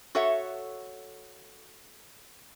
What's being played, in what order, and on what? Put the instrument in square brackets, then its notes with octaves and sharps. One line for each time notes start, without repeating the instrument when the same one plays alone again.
[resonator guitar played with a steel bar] F#4 A4 C#5 E5 F#5